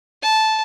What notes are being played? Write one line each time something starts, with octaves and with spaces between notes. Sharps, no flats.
A5